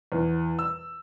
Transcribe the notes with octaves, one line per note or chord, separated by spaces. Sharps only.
E2
E6